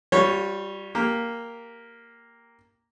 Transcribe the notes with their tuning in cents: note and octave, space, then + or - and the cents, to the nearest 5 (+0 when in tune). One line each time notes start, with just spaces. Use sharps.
G3 +0 F4 +45 C#5 +0
A#3 +0 G4 +0